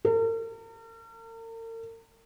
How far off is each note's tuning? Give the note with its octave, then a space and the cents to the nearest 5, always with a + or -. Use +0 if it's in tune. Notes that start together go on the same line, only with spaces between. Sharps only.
A#4 -45